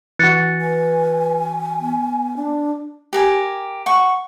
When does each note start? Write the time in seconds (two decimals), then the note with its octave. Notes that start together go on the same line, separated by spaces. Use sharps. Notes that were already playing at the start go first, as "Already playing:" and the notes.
0.19 E3 F#4 F#6 A6 C#7
0.61 B4 G#5
1.80 B3
2.37 D4
3.13 G4 A#4 G#5
3.86 F#5 C#6